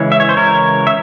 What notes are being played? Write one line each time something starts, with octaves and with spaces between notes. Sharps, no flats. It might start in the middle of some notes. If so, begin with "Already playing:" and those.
Already playing: C#3 E3 G#3 C#4
E5
C#5
C5
A#4 C#5
E5